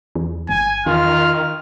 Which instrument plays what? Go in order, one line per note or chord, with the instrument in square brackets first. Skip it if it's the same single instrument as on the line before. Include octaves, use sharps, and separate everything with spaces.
[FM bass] E2
[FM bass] G1 [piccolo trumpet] G#5
[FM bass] E2 [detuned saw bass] D#3 [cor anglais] F4 [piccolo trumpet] F6